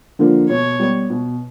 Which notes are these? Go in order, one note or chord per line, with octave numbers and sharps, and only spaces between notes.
D3 F3 A#3
B2 C#5
G3 B3
B2